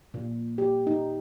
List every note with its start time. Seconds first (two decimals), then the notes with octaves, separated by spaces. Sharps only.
0.14 A#2
0.58 G4
0.87 D#4